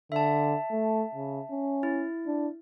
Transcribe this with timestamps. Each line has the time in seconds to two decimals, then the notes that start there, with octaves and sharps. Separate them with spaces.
0.12 D3 E5 A5
0.71 A3
1.15 C#3
1.51 C#4
1.83 E4
2.27 D4